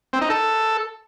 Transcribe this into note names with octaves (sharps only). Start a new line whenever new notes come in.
C4
D#4
A4